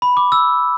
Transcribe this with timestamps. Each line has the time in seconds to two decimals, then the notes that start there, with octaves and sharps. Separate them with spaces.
0.02 B5
0.17 D6
0.32 E6